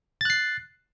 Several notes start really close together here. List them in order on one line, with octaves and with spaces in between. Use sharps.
A6 F#6 C7